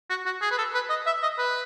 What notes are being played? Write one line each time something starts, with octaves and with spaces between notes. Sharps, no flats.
F#4
F#4
G#4
B4
A4
B4
D#5
E5
D#5
B4